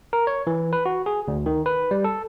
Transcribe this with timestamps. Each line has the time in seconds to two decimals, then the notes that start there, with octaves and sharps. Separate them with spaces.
0.13 A#4
0.27 C#5
0.47 E3
0.73 B4
0.86 F#4
1.06 G#4
1.28 D2
1.46 D#3
1.66 B4
1.91 G3
2.04 A4